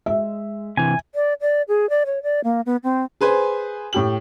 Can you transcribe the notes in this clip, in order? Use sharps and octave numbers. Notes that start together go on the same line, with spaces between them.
G#3 E5
C3 E3 G#5
D5
D5
G#4
D5
C#5
D5
A#3
B3
C4
G#4 B4 C5 G#5
A2 G4 F#7